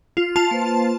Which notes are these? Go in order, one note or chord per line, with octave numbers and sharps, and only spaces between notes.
F4
F4 A5
A#3 B4 C5